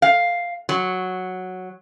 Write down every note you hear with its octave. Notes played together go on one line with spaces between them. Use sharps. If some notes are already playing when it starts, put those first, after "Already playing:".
F5
F#3